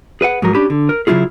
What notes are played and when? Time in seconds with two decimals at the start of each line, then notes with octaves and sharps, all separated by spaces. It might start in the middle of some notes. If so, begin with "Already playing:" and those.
0.21 G#4 B4 D#5 F#5
0.42 G#2 F3 F#3 A#4
0.54 C#4 D4 G4 B5
0.70 D3
0.89 A#4
1.07 C#3 F#3 C#4 E4 F4 G#4